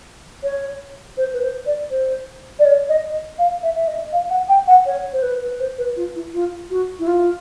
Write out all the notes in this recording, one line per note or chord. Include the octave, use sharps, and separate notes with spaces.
C#5
C5
B4
C5
D5
C5
D5
C#5
D#5
F5
E5
E5
D#5
F5
F#5
G5
F#5
C#5
C5
B4
C5
B4
F4
E4
F4
F#4
E4
F4